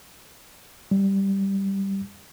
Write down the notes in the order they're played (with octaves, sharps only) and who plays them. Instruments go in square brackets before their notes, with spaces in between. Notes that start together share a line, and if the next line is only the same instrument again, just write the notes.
[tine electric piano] G3